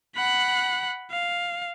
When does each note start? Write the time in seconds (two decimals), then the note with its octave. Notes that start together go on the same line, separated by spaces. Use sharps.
0.16 F#5 B5
1.11 F5